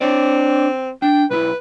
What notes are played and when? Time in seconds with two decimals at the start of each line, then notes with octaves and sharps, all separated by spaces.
0.01 C4 D4 C#5 D5
1.02 D4 G5
1.30 B1 E4 B4